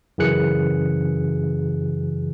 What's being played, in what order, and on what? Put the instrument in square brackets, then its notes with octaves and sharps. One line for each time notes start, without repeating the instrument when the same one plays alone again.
[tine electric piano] F#2 C#3 E3 G#4 F#6 C#7